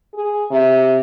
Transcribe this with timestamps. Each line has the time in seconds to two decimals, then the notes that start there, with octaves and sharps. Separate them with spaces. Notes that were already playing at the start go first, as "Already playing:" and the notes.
0.14 G#4
0.51 C3